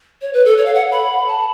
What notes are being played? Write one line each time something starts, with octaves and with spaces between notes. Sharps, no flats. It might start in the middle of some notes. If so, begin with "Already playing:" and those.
C#5
B4
A4
C#5
F5
F#5
B5
A5